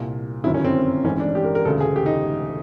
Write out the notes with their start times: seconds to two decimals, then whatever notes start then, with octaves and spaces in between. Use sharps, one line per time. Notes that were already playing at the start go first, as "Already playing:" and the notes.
Already playing: C2 A#2
0.44 G1 F#2 D#3 E4
0.54 C#4
0.65 C4
1.04 A1 G#2 E3 C#4
1.20 D4
1.35 G4
1.45 A#4
1.55 A#4
1.65 E1 D2 C#3 A4
1.80 G#4
1.96 G4
2.06 D#4